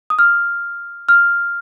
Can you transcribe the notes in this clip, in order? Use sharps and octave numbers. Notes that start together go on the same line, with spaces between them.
D#6
F6
F6